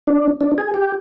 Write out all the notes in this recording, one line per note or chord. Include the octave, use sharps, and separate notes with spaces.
D4
D4
G#4
G4